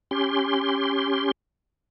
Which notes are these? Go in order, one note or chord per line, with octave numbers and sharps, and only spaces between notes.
C#4 G4 C6